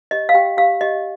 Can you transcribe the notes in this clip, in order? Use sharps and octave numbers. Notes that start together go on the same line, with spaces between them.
G4 D#5
F5
G4 G5
G4 F5
G4 D#5